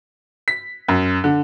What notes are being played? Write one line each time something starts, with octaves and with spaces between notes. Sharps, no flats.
B6
F#2
D3